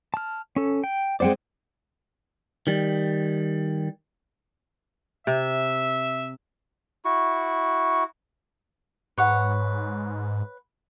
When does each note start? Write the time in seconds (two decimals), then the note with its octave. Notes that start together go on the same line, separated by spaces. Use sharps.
0.14 A5 F6
0.56 C#4 A4
0.84 G5
1.20 G#3 C4 C5 D5 F#5 G5
2.67 D#3 G3
5.27 C3 E5
7.05 E4 F#4 C#6
9.18 G#2 B4 C#5 F#5